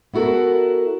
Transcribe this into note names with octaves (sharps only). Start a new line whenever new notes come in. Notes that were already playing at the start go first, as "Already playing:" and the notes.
B3 E4 F#4 A4 A#4